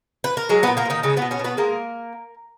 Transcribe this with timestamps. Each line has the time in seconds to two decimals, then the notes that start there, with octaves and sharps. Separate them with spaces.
0.24 B4
0.37 A#4
0.49 F#3 G#3 G#4
0.63 A#2 B3 B4
0.77 A#3 A#4
0.86 A#2 D#3 D#4
1.03 C#3 G#3 C#4
1.17 B3 B4
1.22 B2
1.31 C#4 C#5
1.39 B2
1.44 B3 B4
1.57 G#3 A#3 A#4